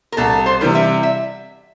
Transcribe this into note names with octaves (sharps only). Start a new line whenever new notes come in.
A#4
C2 A4
C5
C3 E3 G3
E5
E5